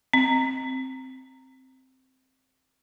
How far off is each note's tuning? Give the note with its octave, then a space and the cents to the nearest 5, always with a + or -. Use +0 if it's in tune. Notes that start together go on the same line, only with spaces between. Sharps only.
C4 +0